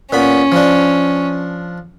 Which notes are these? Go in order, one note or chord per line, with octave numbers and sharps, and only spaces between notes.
A#2 B3 C#4 B5
F3 D4